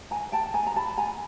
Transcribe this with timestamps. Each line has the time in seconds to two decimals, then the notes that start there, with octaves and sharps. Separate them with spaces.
0.11 G#5 A#5
0.32 G5 A5
0.54 G#5 A#5
0.67 A#5
0.76 A5 B5
0.97 G#5 A#5